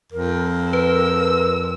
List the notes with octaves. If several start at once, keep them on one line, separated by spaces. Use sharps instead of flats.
F2 A#4
B4 E6